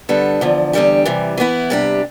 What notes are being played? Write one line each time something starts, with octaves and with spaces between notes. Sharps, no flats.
D3 G3 B3 D4 A4
E2 D3 F3
E2 D3 G3 D4 G4
C3 E3 G3
E3 B3 E4
C3 G3 D4 G4